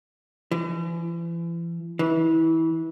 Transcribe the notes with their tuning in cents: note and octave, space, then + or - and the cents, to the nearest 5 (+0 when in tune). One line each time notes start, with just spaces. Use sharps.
E3 +40
E3 -25